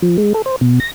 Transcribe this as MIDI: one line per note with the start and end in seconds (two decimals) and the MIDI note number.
0.02 0.17 53
0.18 0.33 56
0.34 0.42 69
0.46 0.56 72
0.61 0.80 47
0.80 0.91 94